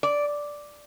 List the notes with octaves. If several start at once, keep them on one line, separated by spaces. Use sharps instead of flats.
D5